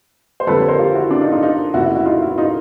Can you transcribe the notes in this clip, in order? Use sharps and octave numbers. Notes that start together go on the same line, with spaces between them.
C5
F2 D3 G3 A4 B4
B4 C#5
A#4 C5
F4 G4
E4 F#4
D4
D#4 F4
D#4 F4
D#4 F4
F1 F2 C#3 E4 F#4
E4 F#4
E4 F#4
D#4 F4
E4 F#4
D#4 F4